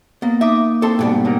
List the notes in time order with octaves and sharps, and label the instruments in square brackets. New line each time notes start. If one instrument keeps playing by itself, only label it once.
[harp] A#3 [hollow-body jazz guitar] B3
[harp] D#4 D6 D#6 [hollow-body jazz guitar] E5
[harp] C4 E4 [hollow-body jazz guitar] A4 A5 C6
[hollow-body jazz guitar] G#2 B2 G3
[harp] G2 D3 A#4